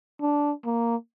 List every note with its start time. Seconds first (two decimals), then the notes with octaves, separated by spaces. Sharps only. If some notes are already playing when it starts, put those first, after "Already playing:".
0.21 D4
0.65 A#3